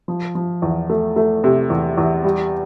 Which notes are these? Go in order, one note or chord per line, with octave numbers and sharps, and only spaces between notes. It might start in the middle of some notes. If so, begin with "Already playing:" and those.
F3
F3
E2
A3
A3
C3
E2
E2
G3